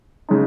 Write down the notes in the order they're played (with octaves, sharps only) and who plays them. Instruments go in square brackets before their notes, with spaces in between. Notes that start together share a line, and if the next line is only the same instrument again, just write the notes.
[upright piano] C#3 G#3 D#4